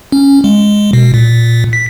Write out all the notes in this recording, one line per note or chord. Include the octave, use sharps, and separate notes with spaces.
C#4
G#3
B2
A#2
B6